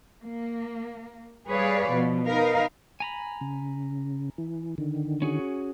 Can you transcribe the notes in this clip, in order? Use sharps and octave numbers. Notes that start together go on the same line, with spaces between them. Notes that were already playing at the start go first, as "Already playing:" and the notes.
A#3
G3 G#4 B4 C#5 D5 F5
B2 F3
D#4 A#4 B4 F5
G#5 A#5 B5
C#3
E3
D3 D#3
C#4 F#4 G#4